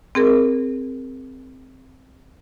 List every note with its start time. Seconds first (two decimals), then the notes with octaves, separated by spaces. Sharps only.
0.15 C4 G#4 A#4